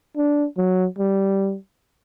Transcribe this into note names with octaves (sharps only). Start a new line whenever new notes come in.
D4
F#3
G3